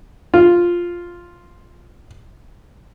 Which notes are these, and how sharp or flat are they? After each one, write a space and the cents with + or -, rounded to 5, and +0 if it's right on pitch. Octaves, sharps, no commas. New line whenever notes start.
F4 +0